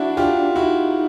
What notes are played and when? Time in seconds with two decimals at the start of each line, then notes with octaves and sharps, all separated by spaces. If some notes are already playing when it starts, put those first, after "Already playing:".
Already playing: D4 E4 F#4
0.17 F4 G4
0.55 D#4 E4 F#4